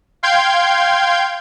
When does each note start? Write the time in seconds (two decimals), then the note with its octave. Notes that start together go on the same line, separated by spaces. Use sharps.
0.23 F5 G5 C6 G6 G#6